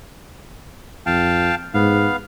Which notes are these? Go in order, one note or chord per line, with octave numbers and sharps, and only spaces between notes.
F2 F5 G5 A5
G#2 B3 F5